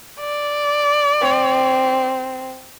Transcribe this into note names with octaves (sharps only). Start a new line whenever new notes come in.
D5
C4